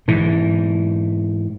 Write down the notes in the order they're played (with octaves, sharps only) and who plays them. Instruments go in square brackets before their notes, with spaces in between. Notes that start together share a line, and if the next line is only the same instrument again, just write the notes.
[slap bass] G#2 E3